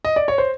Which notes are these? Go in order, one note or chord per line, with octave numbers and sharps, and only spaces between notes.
D#5
D5
C#5
C5